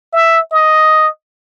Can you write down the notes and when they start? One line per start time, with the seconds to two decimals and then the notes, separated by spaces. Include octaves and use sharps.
0.13 E5
0.52 D#5